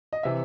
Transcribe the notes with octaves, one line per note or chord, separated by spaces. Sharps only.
D#5
C3 E3 E5